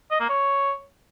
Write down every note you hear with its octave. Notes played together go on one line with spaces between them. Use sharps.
D#5
A#3
C#5